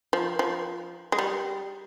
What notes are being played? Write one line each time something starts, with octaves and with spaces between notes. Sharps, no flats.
F3
F3
G#3
G3